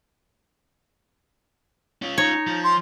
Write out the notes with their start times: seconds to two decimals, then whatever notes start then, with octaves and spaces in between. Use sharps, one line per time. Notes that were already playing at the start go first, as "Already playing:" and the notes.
2.02 C#4 F4
2.18 D#4 C#5
2.47 F3
2.64 C6